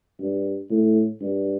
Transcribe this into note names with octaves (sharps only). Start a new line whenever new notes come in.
G2
A2
G2